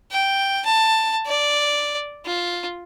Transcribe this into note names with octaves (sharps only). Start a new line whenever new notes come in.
G5
A5
D5
F4